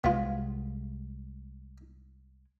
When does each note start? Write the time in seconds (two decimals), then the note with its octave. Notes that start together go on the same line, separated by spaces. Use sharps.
0.04 C2 G#3 B3 F4